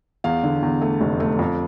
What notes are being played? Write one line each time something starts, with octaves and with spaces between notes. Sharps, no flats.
E2 F5
D3
E2
A3
F1
A3
F2